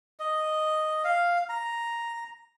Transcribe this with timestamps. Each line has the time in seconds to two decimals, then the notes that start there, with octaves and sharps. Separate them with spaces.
0.20 D#5
1.04 F5
1.49 A#5